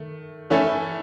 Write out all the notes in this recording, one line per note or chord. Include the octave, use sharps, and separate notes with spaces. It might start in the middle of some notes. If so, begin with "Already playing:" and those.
Already playing: D#3 A3
E3 A3 C#4 E4 A4